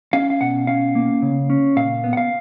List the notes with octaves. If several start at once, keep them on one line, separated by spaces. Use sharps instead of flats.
C#4 F5
F5
B2 F#5
C#4 F5
A#3
C#3
C#4
A#2 F5
B3
F#5
F5